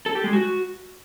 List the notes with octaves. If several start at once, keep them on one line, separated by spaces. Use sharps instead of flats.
A4
G4
G#3
F#4